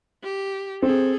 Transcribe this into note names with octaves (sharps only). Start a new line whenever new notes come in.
G4
C4 G#4 A4